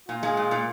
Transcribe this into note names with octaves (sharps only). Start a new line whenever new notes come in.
A#2 F4
G#3
A#2
A#2